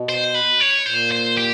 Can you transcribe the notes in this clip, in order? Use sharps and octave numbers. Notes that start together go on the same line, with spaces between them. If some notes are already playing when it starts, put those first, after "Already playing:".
Already playing: B2
C5
B4
C#5
A#2 C5
C5
G4